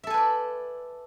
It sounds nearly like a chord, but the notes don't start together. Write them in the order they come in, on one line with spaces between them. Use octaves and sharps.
E5 A4 G#5 B4 D5